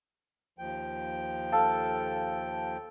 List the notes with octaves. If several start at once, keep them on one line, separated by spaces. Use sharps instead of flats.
D#2 F3 G5
A4 F5